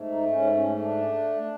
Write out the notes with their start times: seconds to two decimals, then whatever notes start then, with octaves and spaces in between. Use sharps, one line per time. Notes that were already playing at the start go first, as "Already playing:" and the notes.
Already playing: G#2 A3
0.11 D#4
0.30 G#2 C#4
0.55 C#4
0.67 A3
0.80 D4